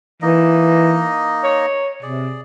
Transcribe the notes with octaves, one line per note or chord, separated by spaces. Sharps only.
E3 A#3 D#4 D#5
C#5
C3 G#4 D5